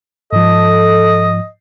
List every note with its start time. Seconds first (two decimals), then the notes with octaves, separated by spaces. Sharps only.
0.33 G#2 F3 A4 D#5